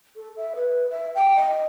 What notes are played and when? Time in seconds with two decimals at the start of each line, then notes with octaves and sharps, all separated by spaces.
0.16 A4
0.36 E5
0.56 B4
0.90 E5
1.15 G5
1.36 D#5